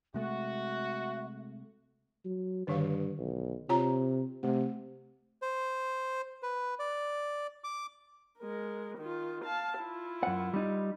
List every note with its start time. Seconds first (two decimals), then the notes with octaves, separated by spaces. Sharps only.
0.14 C3 G#3 A3 F#4 E5
2.25 F#3
2.67 G2 D3 D#3 F5
3.19 B1
3.69 C3 F4 C#5 A#5
4.43 C3 A3
5.42 C5
6.43 B4
6.79 D5
7.64 D6
8.39 G#3 A#4
8.98 D#3 F4
9.44 F5 A5
9.79 E4 F4
10.23 F#2 F#5
10.53 G3 D#4